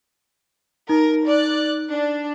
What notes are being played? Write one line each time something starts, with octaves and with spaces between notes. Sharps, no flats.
D#4 A#4
D5 F#6
D4